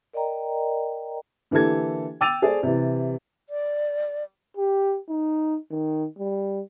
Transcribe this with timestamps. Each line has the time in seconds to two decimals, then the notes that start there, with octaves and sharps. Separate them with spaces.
0.13 A#4 D5 D#5 G5 A#5
1.51 D3 E3 A#3 G4 A4 G#6
2.21 G5 D6 E6 A6 D#7 F7
2.42 G#4 A4 C5 D5
2.63 C3 E3
3.50 D5
4.57 G4
5.09 D#4
5.71 D#3
6.19 G3